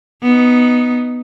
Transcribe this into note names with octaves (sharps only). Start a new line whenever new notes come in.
B3 D#4